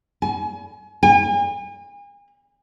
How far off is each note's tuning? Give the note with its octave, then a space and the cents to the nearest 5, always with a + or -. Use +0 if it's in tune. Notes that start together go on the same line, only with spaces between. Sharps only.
G#5 +35
G#5 -40